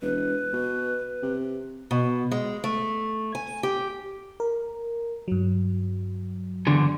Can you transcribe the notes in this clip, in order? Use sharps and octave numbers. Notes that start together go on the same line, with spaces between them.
E1 B4
B2
C3
B2
G#3
A3
G#5
G4
A#4
G2 F#3
E2 D3